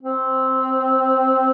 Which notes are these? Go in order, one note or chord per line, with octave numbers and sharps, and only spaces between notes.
C4